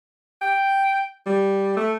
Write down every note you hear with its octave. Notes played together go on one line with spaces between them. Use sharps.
G5
G3
A3